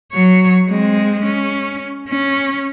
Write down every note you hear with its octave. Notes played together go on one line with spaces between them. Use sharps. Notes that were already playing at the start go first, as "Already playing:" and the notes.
F#3 C#5
G#3 C4
C#4
C#4